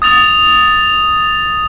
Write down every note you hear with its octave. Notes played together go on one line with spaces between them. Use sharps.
D#6 A6 F7